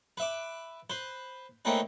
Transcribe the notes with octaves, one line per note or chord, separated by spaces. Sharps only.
B4 E5 D6
B4 C5
A3 A#3 C4 C#4 D#4 B4